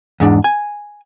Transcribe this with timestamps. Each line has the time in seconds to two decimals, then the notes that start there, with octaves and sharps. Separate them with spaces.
0.20 E2 G#2 D4
0.44 G#5